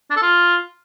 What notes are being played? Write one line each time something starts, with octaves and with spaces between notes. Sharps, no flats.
D4
A4
F4